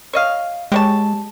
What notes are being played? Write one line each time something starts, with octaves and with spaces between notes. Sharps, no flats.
C#5 D#5 F5
G#3 G4 C#5 A5